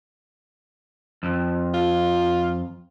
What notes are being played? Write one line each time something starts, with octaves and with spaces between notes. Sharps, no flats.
F2
F4